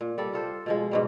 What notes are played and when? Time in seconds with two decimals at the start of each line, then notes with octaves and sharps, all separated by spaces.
0.01 A#2
0.18 G3 A4 D5
0.33 F4 A4 C5
0.66 B2 F3 G#3
0.91 G#2 B2 G3